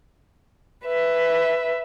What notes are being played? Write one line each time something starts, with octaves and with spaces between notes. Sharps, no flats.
B4 E5